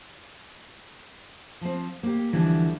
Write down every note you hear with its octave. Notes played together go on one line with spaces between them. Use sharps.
F3 C4
A#3 G4
D2 D3 E3 F3 G3